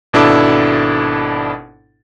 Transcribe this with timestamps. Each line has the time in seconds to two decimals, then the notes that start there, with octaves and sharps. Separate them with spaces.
0.13 G#1 B2 D4 E4 A4 D6